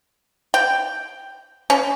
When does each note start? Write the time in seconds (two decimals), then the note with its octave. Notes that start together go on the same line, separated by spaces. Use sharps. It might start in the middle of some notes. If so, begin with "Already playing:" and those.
0.54 G5
1.70 C#4